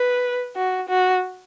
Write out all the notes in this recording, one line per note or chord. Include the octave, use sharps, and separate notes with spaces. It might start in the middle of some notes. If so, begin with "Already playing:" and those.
Already playing: B4
F#4
F#4